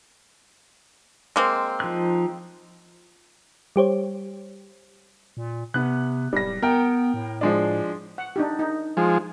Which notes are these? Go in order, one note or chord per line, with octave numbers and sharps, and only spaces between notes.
G#3 A#3 C4
F3 D#4 F#6
G3 G4 C5 C#5
A#2
C3 B3 F#6
D1 G3 A#6
B3 A#4 G5
A2
F3 G#3 D4
F#5
D4 D#4 G4
D#4
F3 G#3